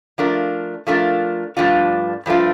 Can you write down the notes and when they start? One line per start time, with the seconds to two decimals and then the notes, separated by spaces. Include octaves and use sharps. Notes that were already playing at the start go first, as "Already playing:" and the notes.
0.18 F3 A3 D4 F4 A#4
0.87 F3 A3 D4 F4 A#4
1.57 G2 F3 A3 D4 F4
2.26 G2 F3 A3 D4 F4